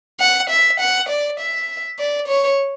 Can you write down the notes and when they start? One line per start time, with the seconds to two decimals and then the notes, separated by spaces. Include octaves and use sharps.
0.20 F#5
0.50 E5
0.80 F#5
1.09 D5
1.40 E5
1.99 D5
2.28 C#5